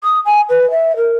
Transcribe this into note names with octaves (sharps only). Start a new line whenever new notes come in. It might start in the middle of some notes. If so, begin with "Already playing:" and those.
D#6
G#5
B4
E5
A#4